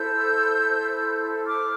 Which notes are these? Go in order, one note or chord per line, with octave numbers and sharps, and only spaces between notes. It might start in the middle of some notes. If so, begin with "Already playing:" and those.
Already playing: E4 A4 C5 E6 G6
D6 F6